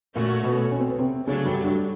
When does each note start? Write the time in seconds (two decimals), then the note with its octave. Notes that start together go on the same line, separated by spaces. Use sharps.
0.15 A#2 A3 A#3 C#4 F#4
0.43 B2 B3
0.72 C#4
0.80 C4
0.90 B3
0.98 C3 C4
1.27 C#3 F#3 A3 C#4 D4
1.45 G2 G3
1.64 G2 G3